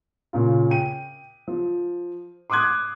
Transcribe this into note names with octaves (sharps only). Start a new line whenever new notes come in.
A#2 C#3 F4
G5 D#7
F3
C6 D6 D#6 F#6 G#6